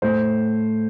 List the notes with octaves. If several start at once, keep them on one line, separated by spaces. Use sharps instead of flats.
A2 A3 C5